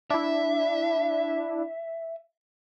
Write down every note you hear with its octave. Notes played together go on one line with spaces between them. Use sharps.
D4 E4 E5